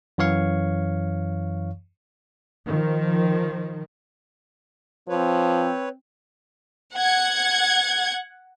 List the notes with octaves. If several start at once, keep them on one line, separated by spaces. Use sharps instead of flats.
F#2 E3 C#5 F5 C#6
D#3 F3
F3 C4 B4 C#5
F#5 G#6